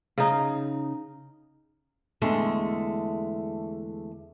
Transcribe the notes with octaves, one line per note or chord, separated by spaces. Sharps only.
C#3 D#4
E2 D3 G#3 A3